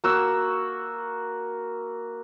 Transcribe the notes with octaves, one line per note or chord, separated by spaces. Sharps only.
A#3 F#4 E6